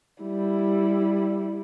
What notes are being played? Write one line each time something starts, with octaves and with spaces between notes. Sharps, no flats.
G3 E4